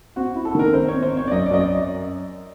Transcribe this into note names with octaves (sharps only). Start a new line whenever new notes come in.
C4 F#4
E4
A4
D#3 A#4
C4 C5
C4 C#5
C5
C4
C#5
D5
F#2 D#5
D5
F#2 D#5
D5